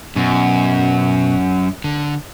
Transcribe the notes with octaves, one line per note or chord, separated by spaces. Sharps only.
F#2 B2
D3